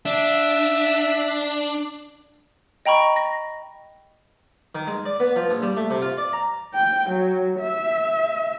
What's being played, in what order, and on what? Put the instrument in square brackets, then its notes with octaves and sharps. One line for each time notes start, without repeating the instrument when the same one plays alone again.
[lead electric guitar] D4 [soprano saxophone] E5
[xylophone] D#5 G5 A#5 B5 C#6
A#6
[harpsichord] D#3
G#3
D5
B3
F3
A#1
G3
A3
C3
F4
D5
A#5
[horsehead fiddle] G5
F#3
E5